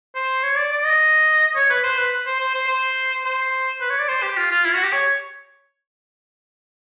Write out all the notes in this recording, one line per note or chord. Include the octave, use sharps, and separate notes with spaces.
C5
C#5
D5
D5
D#5
C#5
B4
C5
B4
C5
C5
C5
C5
C5
B4
C#5
D5
C5
G4
F4
F4
E4
F#4
G4
C#5